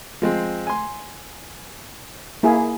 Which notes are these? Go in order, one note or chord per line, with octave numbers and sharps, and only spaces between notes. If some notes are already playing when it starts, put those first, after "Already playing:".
F3 G#3 C4
G#5 C6
A#3 E4 G#4